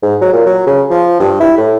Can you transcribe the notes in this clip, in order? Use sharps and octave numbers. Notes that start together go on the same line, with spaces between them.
G#2
F#3
A#2
F#3
C#3
F3
G2
E4
A2